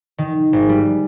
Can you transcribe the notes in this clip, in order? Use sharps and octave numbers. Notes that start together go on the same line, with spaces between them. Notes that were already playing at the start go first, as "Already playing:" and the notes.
D#3
G#1
G3